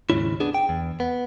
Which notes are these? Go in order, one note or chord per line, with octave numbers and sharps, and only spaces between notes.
D#2 G#2 C#3 C#4 E4
B3 D4 G#4
G5
E2
B3